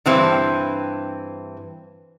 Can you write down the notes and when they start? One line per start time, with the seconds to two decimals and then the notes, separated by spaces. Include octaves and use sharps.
0.06 G2 E3 C4